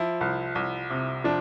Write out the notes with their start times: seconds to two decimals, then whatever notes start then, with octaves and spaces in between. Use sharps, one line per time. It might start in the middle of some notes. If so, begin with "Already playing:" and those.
Already playing: F3 E4
0.21 C2
0.55 C2
0.90 C3
1.24 F3 D4